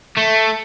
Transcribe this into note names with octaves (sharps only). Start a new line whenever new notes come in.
A3